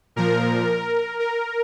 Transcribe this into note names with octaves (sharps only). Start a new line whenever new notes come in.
A#2 F3 A#4
A#4